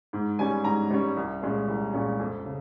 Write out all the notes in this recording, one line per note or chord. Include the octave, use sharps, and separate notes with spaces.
G#2
G3 C#4 G#5
G#2 A#5
G3 C#4
C2
A#2 G#3 C#4
C2
A#2 G#3 C#4
F2
C#3